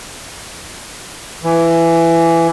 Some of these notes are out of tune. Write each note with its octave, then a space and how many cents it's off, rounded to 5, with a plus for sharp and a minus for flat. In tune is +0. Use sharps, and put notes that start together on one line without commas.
E3 +15